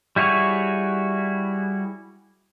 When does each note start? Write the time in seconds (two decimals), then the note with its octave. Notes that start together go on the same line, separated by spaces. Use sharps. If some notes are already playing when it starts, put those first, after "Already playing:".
0.16 G3 E4 F#4 G#4 C#5